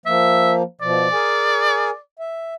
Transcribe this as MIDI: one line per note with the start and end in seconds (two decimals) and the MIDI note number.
0.06 0.63 53
0.06 0.63 58
0.06 0.53 76
0.81 1.07 47
0.81 1.07 53
0.81 1.99 74
1.13 1.90 68
1.13 1.90 70
1.13 1.90 80
2.19 2.54 76